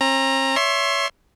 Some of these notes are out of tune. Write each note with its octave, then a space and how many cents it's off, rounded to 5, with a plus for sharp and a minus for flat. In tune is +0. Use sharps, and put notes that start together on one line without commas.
C4 +45 A#5 +0
C#5 +25 E5 +10 C6 +30